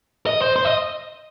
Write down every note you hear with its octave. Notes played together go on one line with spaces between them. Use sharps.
D#5
C5
C5
D#5